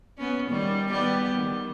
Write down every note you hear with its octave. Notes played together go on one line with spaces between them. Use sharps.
B3 C#4
D#3 G3
G3 B3 G4
D#3